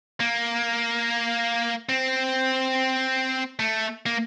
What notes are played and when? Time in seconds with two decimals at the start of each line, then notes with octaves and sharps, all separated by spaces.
0.20 A#3
1.89 C4
3.60 A3
4.06 A#3